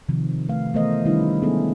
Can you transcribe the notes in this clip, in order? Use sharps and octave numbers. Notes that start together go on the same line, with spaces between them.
C3 D#3 F3
A3 B4 F5
E3 A3 B3 A#4 C5 D#5
D#3 G3 C#4 D4 E4
G#3 B3 C#4 D#4 G#4 A4